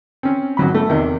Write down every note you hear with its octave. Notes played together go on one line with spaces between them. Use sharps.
C4 C#4
G#1 F#3 B5
A3
E2 C3 D#3